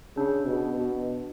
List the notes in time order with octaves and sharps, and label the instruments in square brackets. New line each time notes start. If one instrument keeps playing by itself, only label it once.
[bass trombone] C#3 [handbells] D4
[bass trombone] B2
B2